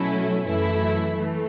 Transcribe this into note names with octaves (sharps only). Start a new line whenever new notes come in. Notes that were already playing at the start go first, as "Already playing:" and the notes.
Already playing: B2 F#3 A3 C#4 E4
F#2 E3 A3 E4
E3 A3